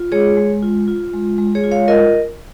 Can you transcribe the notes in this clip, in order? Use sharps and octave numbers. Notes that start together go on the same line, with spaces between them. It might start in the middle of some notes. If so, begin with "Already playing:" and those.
Already playing: F4
G#3 G#4 C#5
G#3
F4
F4
G#3
G#3
G#4 C#5
F4
C#5 F5
F4 A#4 D#5